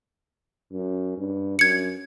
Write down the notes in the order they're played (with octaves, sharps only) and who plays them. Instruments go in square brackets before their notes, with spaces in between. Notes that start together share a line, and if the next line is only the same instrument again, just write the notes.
[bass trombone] F#2
G2
[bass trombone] F#2 [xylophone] G#6 C#7